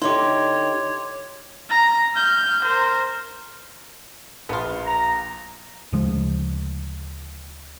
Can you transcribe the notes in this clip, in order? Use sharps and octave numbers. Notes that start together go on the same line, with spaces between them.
D3 D#4 E4 G4 C#5 C6 D6
A#5
F6 G6
A#4 C5
A#1 B3 F4
A#5
D2 C#3 F3 G#3